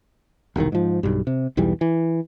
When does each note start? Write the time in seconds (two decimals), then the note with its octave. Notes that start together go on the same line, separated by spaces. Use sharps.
0.56 E1 C2 C3 D#3
0.72 G#2 F3
1.03 B1 G2
1.27 C3
1.57 B1 E2 E3 G3
1.81 E3